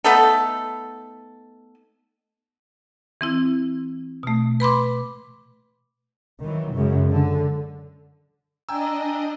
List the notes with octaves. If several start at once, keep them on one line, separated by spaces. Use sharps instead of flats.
A3 B3 D#4 A4
E3 C4 E4
B2 A3
B4 B5 C6 D6
D#3 E3 F#3
F#2 C#3 G#3
D3
D4 D#5 G5 G#5 A#5 E6